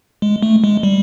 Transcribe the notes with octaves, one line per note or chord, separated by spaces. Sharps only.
G#3
A3
G#3
G3